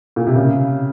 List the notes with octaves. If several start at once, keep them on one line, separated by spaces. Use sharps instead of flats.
A#2
C3
C#3